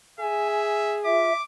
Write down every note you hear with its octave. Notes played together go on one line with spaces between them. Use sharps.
G#4 E5 G#5
G#5
F4 E5 D6